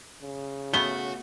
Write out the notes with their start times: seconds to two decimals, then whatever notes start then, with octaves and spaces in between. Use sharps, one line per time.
0.22 C#3
0.74 A3 B3 F#4 G7